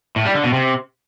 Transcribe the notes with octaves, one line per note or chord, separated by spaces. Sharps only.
A2
G3
D3
B2
C3